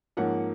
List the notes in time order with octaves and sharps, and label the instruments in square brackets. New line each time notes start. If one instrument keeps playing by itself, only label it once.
[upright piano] G#2 F3 A#3 C#4 F#5